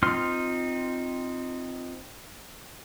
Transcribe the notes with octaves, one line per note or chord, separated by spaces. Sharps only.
C4 D#4 F4 C6 F6